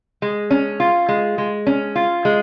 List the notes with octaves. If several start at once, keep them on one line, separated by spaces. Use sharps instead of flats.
G#3
C#4
F4
G#3
G#3
C#4
F4
G#3